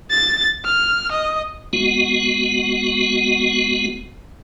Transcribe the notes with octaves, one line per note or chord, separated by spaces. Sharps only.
A6
F6
D#5
G#3 B3 F#4